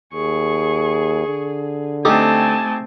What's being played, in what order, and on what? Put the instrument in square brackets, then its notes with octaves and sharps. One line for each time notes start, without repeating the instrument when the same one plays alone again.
[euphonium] D#2 [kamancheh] G#4 [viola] C#6
[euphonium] D3
[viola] A3 C4 [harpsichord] D#4 G4 A4 [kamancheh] G#5 A5